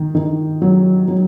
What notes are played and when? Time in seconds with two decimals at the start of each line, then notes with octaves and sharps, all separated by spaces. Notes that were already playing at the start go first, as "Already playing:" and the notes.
Already playing: D#3
0.15 D#3
0.62 F#3
1.08 F#3